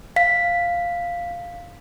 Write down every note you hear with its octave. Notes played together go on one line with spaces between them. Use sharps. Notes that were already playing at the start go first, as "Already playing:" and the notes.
F5 B6